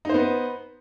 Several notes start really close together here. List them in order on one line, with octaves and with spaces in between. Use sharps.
D#4 C5 B3